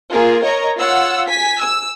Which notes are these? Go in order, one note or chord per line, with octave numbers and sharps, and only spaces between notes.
A#3 F4 G#4 A#4
A#4 C#5 D#5 A#5
F4 C#5 F#5 E6
G#5 B6
E6